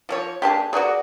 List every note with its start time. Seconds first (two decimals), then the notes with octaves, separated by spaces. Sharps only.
0.09 F3 A4 C#5
0.42 A#3 D4 G4 G#4 A5
0.73 F#4 G#4 A#4 B4 D5